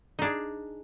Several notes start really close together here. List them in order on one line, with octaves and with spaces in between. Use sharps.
D#4 D4 G#4